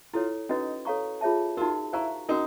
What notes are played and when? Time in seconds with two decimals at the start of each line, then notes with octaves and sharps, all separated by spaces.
0.14 E4 F4 A4 C#5
0.49 C#4 D#4 F#4 B4 D#5
0.85 A4 C#5 F5 A#5 C#6
1.21 F4 G#4 C#5 E5 A5
1.57 D#4 F4 F#4 A#4
1.93 E4 C5 F5 A#5 C#6
2.29 C#4 D#4 F#4 A#4